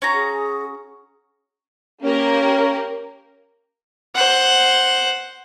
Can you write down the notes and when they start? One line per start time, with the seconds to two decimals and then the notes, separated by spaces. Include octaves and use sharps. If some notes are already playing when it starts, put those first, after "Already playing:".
0.02 C#4 F#4 A#5
0.14 G#4
2.02 A#3 C#4 G4 A#4
4.15 C5 F#5